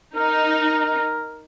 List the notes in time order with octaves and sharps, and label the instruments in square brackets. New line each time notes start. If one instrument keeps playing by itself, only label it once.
[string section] D#4 [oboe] A#4